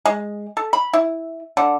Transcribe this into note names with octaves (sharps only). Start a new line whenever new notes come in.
G#3
A4
B5
E4
D3